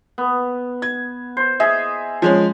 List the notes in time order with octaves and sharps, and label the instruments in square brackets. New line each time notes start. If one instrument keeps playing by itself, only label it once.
[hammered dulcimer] B3
[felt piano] G#6
[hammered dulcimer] C5
[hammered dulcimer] G#4 D#5 [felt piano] E5
[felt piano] F3 G#3 C#4